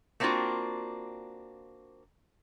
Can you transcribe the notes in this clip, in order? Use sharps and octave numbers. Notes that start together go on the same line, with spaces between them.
A3 A#3 C4 D4 F4 F#4